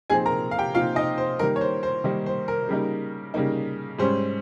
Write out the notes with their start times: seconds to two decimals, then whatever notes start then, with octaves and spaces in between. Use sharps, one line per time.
0.10 A#2 F3 C4 D#4 G#4 G#5
0.26 A#4 A#5
0.51 F5
0.58 G4 G5
0.74 A#2 F3 C4 D#4 F4 F5
0.95 D#4 D#5
1.18 C5
1.39 D#3 G3 A#3 D#4 A#4
1.56 C#5
1.61 C5
1.83 C5
2.04 D#3 G3 A#3 D#4
2.26 C5
2.48 A#4
2.69 C#3 G3 A#3 D#4
3.34 C#3 G3 A#3 D#4
3.99 G#2 G3 C#4 C5